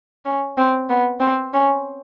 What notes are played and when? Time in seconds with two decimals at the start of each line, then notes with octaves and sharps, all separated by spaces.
0.25 C#4
0.58 C4
0.90 B3
1.21 C4
1.53 C#4